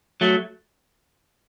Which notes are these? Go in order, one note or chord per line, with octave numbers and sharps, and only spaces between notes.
F#3 A3